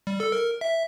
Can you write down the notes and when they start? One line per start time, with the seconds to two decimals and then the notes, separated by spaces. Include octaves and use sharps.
0.07 G3
0.20 A4
0.32 A#4
0.61 E5